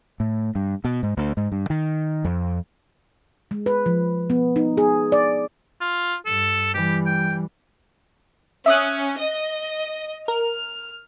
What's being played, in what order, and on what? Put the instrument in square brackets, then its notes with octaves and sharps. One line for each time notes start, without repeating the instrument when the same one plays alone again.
[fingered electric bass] A2
G2
B2
G#2
D2
G#2
G2
D#3
F2
[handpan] G#3
B4
F3
B3
D#4
G#4
D5
[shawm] F4
[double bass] G2 [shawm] A4
[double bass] E3 G3 [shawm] G4
[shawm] G5
[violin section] C#4 [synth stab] E5 D#6 F#6
[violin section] D#5
[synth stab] A#4 [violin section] F6